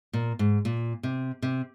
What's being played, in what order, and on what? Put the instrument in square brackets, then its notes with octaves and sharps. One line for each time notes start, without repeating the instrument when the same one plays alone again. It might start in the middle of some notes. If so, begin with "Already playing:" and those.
[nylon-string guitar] A#2
G#2
A#2
C3
C3